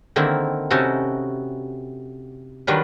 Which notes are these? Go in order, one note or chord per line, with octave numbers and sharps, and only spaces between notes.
D3 D#3 A#3 C4 E4
C3 C#4 D#4 E4 F#4 A4
D#3 F#3 G3 D4 F4 B4